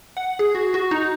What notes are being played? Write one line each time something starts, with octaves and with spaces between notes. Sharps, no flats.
F#5
G#4
F#4
F#4
D#4